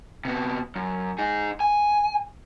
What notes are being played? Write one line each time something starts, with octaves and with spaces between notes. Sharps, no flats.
C3 B3
F#2
D#4 G#4
G#5